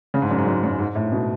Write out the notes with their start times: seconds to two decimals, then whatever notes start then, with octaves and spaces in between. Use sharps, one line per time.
0.14 C#3
0.22 G#2
0.31 F#2
0.38 G#2
0.46 F#2
0.63 F#2
0.79 G#2
0.95 A2
1.12 B2